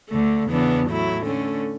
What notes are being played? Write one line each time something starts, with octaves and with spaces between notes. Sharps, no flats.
D2 D3 A3
E2 C#3 E3 B3 D4
A2 F#3 A3 E4
D3 A3 C#4